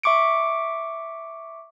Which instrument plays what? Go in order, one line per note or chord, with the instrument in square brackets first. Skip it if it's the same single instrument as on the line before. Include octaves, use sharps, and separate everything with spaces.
[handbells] E5 C#6 D6 C#7 D7